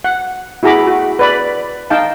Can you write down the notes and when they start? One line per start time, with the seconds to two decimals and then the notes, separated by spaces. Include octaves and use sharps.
0.04 F#5
0.63 E4 F#4 G#4 A#5 B5 D6
0.87 F#4
1.19 B4 D5 B5
1.90 D#4 F5 G5 A5